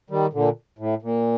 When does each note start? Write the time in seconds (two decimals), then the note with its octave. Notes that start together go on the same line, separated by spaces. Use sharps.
0.10 D#3 G3
0.33 A#2 D3
0.79 A2
1.02 A#2